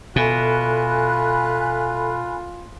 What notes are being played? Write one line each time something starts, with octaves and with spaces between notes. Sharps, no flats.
B2 F4 A4 E5 G#5 B5 F#6